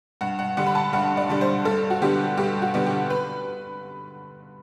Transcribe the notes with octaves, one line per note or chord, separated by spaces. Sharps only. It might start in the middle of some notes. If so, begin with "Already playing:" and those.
G2 F#5
F#5
D3 G3 D4 F#5
B5
A5
G2 F#5
D5
D3 G3 D4
C5
G2 A4
F#4
D3 G3 B3 D4 G4
G2 G4
F#4
D3 G3 B3 D4
G4
B4